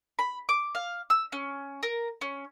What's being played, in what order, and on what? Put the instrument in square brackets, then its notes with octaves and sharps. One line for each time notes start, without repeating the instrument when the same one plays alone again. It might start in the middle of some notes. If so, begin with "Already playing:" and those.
[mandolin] B5
D6
F5
E6
C#4
A#4
C#4